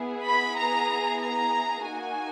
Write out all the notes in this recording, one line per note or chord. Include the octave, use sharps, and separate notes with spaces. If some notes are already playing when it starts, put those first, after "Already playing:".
Already playing: B3 E4 G#4
B5
A#5
A#5
A#3 D#4 F#4 G#5